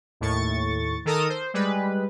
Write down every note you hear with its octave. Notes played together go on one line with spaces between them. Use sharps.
D#2 A2 C#6 A6
D#3 A4 A#4 D#6
C5
G3 G#3 B4